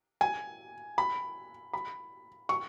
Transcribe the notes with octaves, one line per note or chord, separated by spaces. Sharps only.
G#5
B5
B5
C#6